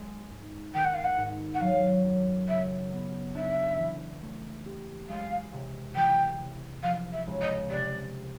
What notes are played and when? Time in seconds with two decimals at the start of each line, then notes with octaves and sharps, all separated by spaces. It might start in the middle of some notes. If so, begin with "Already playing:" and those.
Already playing: G#3
0.31 G#2
0.74 D#3 G5
0.85 F#5
0.94 F5
1.04 F#5
1.18 G#2
1.54 F#5
1.61 F#3 F5
2.05 F#2
2.48 C#3 E5
2.92 B3
3.35 D4 E5
3.78 E3
4.22 A3
4.66 G4
5.09 G#3 F5
5.53 C3
5.96 E3 G5
6.39 C3
6.83 F3 F5
7.12 E5
7.27 C#2
7.41 D#5
7.70 C3 D5